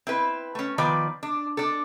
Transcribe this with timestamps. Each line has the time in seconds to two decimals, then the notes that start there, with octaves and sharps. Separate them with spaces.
0.07 C4 E4 B4
0.55 A3 C#4
0.78 D#3 F3 B3 B4 D5
1.23 D4
1.57 D4 A4